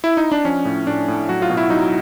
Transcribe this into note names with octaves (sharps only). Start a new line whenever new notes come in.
E4
D#4
D4
F3 C#4
A2
A2 D4
A2
F#3 F#4
F4
B2
E4
F#3 D#4